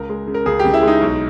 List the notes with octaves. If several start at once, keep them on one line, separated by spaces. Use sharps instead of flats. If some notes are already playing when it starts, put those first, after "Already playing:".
Already playing: C#2 A#4
G#3
C#3
A#4
C#2 G#4
G4
C#2
E4
G#3 D#4
B1